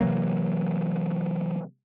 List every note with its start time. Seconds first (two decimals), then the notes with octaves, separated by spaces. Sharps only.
0.01 C3 E3 F#3 A#3